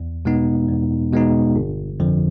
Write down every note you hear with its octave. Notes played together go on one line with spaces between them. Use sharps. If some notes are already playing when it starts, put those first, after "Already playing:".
Already playing: E2
B2 G#3 B3 D#4
E2
B2 G#3 B3 D#4
G1
F2 D3 F3